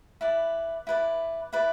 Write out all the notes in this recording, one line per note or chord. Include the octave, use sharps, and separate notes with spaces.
E4 B4 D5
E4 B4 D5
E4 B4 D5